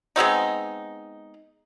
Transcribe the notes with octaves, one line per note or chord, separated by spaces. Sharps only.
G#3 B3 C4 D#4